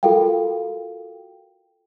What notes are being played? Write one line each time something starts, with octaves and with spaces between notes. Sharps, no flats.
F4 F#4 A4 A#4 F5 G5